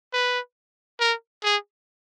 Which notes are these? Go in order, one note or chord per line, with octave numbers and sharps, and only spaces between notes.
B4
A#4
G#4